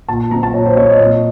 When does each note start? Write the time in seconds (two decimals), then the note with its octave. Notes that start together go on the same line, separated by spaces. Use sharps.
0.08 A#2 A5
0.31 F#3 C4 A#5
0.43 A5
0.54 A#2 C#5
0.66 C5
0.77 F#3 C4 C#5
0.88 D#5
1.00 A#2